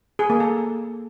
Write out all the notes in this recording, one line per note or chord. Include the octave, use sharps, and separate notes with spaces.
G#4
A#3
A4